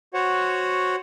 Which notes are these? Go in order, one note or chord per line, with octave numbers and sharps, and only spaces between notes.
F#4 C5 C#5 F#5